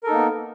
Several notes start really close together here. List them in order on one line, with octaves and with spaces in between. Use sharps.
A#4 A4 D#4 A#3 B3